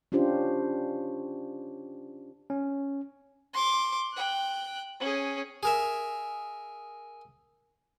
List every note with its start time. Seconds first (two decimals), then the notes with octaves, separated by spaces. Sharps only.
0.12 C#4 D4 F4 G4 C5
2.50 C#4
3.53 C6 D6
4.13 G5 F#6
5.00 C#4 G#4
5.63 G#4 A#4 E5